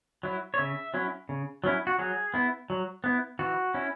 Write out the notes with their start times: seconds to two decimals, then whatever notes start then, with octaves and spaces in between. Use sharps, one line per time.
0.23 F#3 E4
0.54 C#5
0.58 C#3 E5
0.94 F#3 C#4 E4
1.29 C#3
1.64 F#3 C#4 E4
1.87 F#4
1.99 F#3 G#4
2.34 B3 E4
2.70 F#3
3.04 B3 E4
3.39 E3 F#4
3.74 C#4 E4